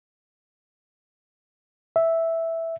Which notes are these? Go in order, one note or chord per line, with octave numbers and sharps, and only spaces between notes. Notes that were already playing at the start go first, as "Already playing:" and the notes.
E5